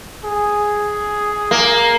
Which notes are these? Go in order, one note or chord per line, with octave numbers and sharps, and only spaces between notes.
G#4
A#3